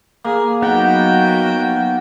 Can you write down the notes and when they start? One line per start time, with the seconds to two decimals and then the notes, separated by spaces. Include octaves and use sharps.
0.25 A#3 G#4
0.62 F#3 B3 D#4 F#4 A#4 F#5 G5